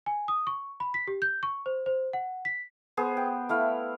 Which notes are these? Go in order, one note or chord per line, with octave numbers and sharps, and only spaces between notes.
G#5
D#6
C#6
B5
B6
G4
G6
C#6
C5
C5
F#5
B6
B3 G#4 C5
G5
A3 E4 F5